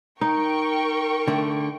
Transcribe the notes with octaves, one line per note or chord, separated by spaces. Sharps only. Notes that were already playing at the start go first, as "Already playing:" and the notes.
D#4 A#4 G5 C#6
D3 A3